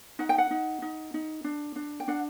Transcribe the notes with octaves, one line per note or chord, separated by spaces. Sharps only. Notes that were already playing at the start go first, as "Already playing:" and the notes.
D#4 F#5
G5
F#5
D#4
D#4
D#4
D4
D4
G5
D4 F#5